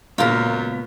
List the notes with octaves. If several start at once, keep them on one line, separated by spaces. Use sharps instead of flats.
C#2 F#2 A#2 B3 F4 A#4